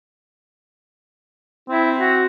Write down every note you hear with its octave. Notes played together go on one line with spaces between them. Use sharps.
C4 E4
F#4